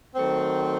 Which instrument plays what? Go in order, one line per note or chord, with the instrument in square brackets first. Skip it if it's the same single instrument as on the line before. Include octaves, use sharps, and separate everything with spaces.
[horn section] D#3 F#3 A3 C4